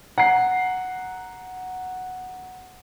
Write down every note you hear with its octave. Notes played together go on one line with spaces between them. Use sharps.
F#5 A#5 C7